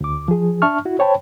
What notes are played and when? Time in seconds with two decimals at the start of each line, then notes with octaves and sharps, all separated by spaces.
0.01 D2 D6
0.28 F3 G#4
0.62 D4 E5 A5 C#6 F6
0.85 E4 F#4
0.99 C5 C#5 G5 A5 B5